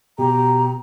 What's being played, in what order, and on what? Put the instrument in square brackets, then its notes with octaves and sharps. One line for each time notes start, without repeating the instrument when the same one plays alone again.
[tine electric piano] B2 [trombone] G4 [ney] A#5